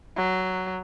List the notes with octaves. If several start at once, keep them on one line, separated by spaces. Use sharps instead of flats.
F#3